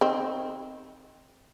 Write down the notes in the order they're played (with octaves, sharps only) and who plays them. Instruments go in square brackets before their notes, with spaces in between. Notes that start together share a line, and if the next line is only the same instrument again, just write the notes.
[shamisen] D#3 C4